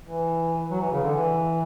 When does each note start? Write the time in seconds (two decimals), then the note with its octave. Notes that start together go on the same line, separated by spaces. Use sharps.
0.04 E3
0.71 F#3
0.81 E3
0.92 C#3
1.03 D3
1.14 E3